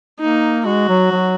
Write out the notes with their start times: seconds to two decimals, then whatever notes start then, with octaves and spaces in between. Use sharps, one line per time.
0.20 A#3 D#4
0.66 G#3 F#4
0.89 F#3
1.12 F#3